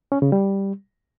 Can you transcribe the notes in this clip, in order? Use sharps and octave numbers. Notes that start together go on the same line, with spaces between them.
C#4
C#3
G3